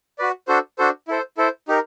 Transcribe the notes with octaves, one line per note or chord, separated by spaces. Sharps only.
F#4 B4 D5
D4 F#4 A4 C5
D4 F#4 A4 C5
E4 A4 C5
E4 A4 C5
D#4 G4 A#4